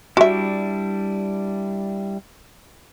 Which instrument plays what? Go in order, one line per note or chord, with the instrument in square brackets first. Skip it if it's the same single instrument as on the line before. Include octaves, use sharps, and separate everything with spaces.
[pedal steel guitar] G3 D4 E4 [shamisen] F#4 E5